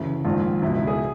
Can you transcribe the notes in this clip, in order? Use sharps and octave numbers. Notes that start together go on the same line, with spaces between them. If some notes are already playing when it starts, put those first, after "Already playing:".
Already playing: D2 C#3 E3
A#1 G#2 D#3 F4
C#2 B2 E4
E4
G#4